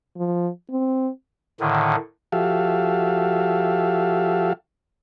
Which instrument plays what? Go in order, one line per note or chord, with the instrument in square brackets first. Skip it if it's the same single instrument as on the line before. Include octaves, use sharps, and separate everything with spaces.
[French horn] F3
C4
[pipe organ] A2 D3 D#3
[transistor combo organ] F3 F#4 G4 A4 E5 F5